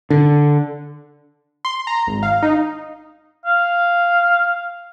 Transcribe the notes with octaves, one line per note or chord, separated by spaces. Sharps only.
D3
C6
A#5
G#1
F5
D#4
F5